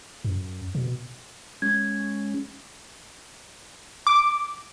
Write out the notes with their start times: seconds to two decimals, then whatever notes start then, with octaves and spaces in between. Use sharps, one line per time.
0.24 F#2
0.75 B2
1.62 G#3 C#4 G#6
4.07 D6